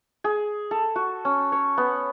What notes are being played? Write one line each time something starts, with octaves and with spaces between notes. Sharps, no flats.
G#4
A4
F#4
C#4
C#5
B3